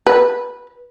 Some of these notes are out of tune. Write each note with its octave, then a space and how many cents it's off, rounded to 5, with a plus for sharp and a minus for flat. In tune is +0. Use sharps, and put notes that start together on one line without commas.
B4 -15